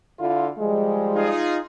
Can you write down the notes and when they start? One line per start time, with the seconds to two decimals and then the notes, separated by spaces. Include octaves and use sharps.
0.20 D3 E4 F4
0.59 F3 G3 G#3
1.15 D#4 F4 G#4